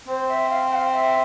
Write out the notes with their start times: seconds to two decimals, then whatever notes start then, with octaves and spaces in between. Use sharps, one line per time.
0.08 C4 C5
0.28 E5
0.50 F5
0.71 G5
0.75 F5
0.93 E5